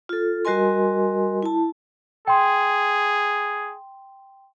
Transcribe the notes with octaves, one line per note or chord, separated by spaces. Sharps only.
F4 A4
G3 F#4 A#4 D#5 G#5 C6
E4 A5
G#4 G5 C6